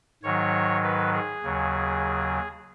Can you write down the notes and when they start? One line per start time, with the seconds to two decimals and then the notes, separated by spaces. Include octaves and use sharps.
0.23 G#2 D#3 F#3 C#5
0.83 B4
1.13 G#4
1.43 D#2 C#3 F#3